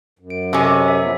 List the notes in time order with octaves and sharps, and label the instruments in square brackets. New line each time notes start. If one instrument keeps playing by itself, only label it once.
[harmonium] F#2
[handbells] D7
[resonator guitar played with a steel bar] C3 C#4 [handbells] A4 D#5 G#5
[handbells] E5
[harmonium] A#2 F3 B3